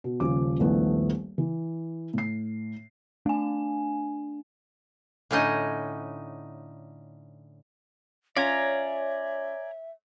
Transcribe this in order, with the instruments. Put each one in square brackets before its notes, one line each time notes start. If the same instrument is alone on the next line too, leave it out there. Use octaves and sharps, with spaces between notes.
[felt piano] B2
D#1 C#3 F3 D6
D#1 A#1 A3 B3 E4
E3
A2 C7
[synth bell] A3 G#5 [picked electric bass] D4
[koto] A2 D3 C#4 D#4 D#5
[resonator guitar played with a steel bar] C#4 F4 [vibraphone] C#5 [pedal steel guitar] D5 G#5 A#5 [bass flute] E5